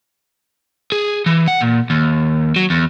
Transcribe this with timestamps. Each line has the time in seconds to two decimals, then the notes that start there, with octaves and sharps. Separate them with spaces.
0.92 G#4
1.26 E3
1.48 F#5
1.61 A#2
1.90 D#2
2.56 F#3
2.70 E2